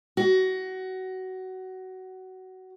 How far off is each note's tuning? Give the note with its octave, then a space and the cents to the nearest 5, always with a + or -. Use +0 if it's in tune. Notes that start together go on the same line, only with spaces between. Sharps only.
F#4 +20